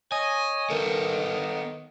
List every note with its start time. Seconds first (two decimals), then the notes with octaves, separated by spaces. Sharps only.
0.12 C#5 D#5 G#5
0.70 D#3 B3 A4